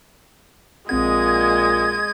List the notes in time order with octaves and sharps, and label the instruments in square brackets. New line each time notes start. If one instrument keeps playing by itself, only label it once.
[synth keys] A#1 C4 F#5 [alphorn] A#2 [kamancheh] G#3 D#5 [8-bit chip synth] G#6